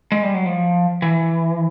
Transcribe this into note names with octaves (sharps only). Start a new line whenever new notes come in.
G#3
G3
F#3
F3
E3